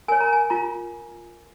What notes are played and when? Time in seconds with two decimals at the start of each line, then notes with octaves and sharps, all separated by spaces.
0.08 A#4 C#5 G#5
0.20 A#5
0.33 G#5
0.50 F4 A#5